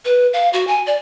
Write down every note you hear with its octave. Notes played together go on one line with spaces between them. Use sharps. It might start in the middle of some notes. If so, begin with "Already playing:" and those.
B4
F5
F#4
G#5
D5